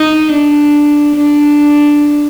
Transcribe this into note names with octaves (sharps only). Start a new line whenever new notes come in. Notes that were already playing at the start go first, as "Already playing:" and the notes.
Already playing: D#4
D4
D4